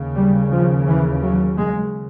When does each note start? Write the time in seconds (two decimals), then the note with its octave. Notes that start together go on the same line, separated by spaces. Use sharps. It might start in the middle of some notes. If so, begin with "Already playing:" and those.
Already playing: D#2 C#3
0.15 G3
0.52 F3
0.87 E3
1.22 F#3
1.58 G#3